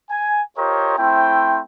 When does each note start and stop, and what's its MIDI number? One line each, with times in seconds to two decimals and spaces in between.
0.10 0.41 80
0.58 0.95 65
0.58 0.95 67
0.58 0.95 70
0.58 0.95 72
0.58 0.95 73
0.58 0.95 75
0.99 1.59 57
0.99 1.59 60
0.99 1.59 64
0.99 1.59 72
0.99 1.59 79